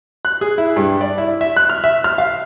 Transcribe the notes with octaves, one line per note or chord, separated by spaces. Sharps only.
F#6
G#4
E4
G2
D5
E4
E5
F#6
F6
E5
F6
F5